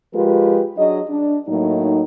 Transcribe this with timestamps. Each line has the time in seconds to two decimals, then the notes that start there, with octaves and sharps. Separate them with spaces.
0.14 F3 G#3 F4 G4 A#4 B4
0.77 F#3 D4 G#4 D#5
1.08 D4
1.48 A2 F#3 A#3 D#4